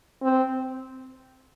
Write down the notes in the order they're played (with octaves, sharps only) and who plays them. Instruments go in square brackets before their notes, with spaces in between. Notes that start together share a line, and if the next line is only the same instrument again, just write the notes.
[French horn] C4